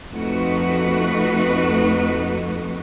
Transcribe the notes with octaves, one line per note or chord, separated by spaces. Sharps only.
F2 A3 D#4 F#4 B4